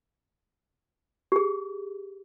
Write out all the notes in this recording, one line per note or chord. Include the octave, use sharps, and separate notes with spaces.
G4 G#4